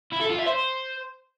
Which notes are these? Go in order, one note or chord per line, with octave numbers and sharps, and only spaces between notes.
E4
A4
F4
E5
C5